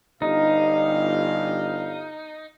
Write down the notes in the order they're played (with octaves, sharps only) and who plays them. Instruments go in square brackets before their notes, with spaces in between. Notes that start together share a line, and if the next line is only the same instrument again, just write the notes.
[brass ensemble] G1 G2 F5 [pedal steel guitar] D#4